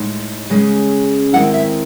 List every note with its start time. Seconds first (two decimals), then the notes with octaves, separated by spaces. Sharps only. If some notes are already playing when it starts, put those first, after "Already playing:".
Already playing: A2 G#3 D#4
0.50 C#3 G#3 C#4
1.33 D#3 G#3 C4 E4 F#5
1.54 E5